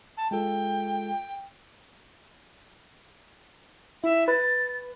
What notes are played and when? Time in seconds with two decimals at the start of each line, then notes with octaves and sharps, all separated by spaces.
0.17 A5
0.31 G#3 F4 A4 G5
4.04 E4 E5
4.28 B4 A6